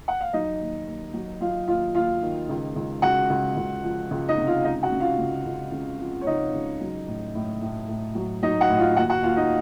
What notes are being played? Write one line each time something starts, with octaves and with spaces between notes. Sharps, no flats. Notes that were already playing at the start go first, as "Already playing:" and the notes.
F#5
F5
F#3 D#4 D#5
D#2
D#2
F#3
F#3 F4 F5
D#2 F4 F5
D#2 F4 F5
D#3
C#2
C#2
C#2 F#4 F#5
C#2
C#2
F3
C#2
D#4 D#5
C3
F4 F5
C#2 D#4 D#5
F#4 F#5
C#3
F4 F5
C#3
C#2
C#2
F3
C#5
C#3 D#4 D#5
C#2
F#3
A2
A2
A2
A2
F#3
F#3 D#4 D#5
F#4 F#5
A2
F4 F5
D#2 F#4 F#5
F#4 F#5
D#2 F4 F5
D#4 D#5